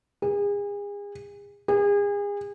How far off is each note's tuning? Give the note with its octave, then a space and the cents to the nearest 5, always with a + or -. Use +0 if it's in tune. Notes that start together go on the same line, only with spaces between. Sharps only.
G#4 -35
G#4 -35